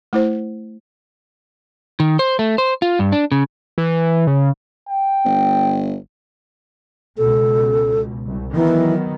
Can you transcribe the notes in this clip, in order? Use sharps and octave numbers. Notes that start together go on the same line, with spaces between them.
A3 E4 C5
D#3
C5
A3
C5
F4
G2
D4
C#3
E3
C#3
G5
G1
C#2 B2 A4
C2
D#3 E3 F#3 B3